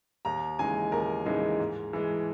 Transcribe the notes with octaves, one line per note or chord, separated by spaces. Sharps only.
D#2 A#5
C#3 E3 G#3 D#4 G#5
D#2 A#4
C#3 E3 G#3 D#4
G#2
E3 G#3